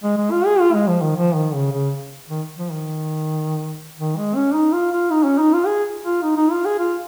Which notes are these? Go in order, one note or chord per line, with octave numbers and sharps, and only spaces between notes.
G#3
G#3
F4
G#4
F4
G#3
F3
D#3
F3
D#3
C#3
C#3
D#3
F3
D#3
D#3
G#3
C#4
D#4
F4
F4
D#4
C#4
D#4
F4
G#4
F4
D#4
D#4
F4
G#4
F4